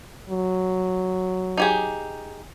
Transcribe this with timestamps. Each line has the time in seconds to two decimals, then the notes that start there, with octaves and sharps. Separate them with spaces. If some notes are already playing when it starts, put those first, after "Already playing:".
0.29 F#3
1.57 D#4 G4 G#4